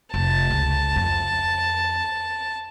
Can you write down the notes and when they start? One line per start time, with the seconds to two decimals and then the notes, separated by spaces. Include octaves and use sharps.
0.14 F1 A5
0.50 C#2
0.96 F2